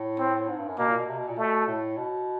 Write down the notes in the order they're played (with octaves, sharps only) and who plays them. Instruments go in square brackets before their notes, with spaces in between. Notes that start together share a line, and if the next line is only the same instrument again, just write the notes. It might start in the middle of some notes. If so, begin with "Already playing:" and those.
Already playing: [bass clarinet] A2
[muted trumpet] C4
[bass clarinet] G#2
G2
F#2
[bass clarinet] B2 [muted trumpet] A#3
[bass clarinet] A#2
B2
C3
B2
A#2
[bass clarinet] B2 [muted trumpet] A3
[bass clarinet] A2
B2